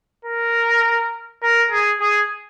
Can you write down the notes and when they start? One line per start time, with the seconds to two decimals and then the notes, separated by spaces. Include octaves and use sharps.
0.25 A#4
1.42 A#4
1.71 G#4
2.00 G#4